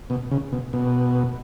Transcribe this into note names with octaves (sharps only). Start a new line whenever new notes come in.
B2
C#3
B2
B2